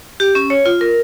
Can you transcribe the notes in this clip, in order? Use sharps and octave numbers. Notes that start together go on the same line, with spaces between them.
G4
C#4
C#5
F4
A#4